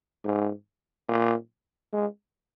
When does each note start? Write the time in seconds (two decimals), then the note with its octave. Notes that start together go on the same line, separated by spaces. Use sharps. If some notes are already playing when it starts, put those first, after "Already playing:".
0.25 G#2
1.09 A#2
1.93 G#3